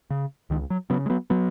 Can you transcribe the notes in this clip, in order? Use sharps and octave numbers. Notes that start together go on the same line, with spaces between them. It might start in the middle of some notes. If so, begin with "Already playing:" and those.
C#3
C#2 D#3
F#3
C#3 F#3 B3
G#3
F#3 B3
F#3 B3